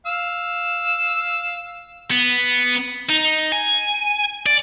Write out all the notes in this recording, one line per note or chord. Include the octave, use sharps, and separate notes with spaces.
F5 E6
B3
D#4
G#5
D5